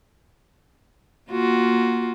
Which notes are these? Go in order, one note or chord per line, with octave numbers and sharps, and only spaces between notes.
A#3 F4 F#4